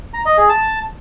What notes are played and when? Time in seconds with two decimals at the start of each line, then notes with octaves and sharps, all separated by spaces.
0.14 A#5
0.26 D#5
0.37 G#4
0.49 A5